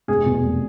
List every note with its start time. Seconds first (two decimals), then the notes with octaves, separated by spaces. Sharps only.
0.08 F1 G#4
0.26 E2 B2
0.43 F1